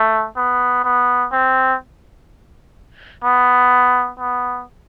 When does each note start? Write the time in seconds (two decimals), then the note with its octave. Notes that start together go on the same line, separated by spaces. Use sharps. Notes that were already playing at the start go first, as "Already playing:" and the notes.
Already playing: A3
0.36 B3
0.84 B3
1.32 C4
3.24 B3
4.20 B3